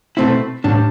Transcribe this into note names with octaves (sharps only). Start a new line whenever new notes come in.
B2 A3 C4 E4
A2 G3 D4